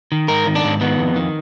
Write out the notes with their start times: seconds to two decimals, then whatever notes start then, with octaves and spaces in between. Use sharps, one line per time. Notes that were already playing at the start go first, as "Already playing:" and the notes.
0.12 D#3
0.28 G#2 A#4
0.47 D#3
0.55 D4
0.64 G#2
0.81 D#3 B3
0.99 F2
1.16 D#3